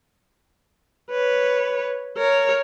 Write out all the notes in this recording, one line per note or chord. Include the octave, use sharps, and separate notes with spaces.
B4 C#5
A#4 C#5